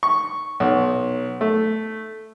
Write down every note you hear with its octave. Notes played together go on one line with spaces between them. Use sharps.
C#6
B1
A3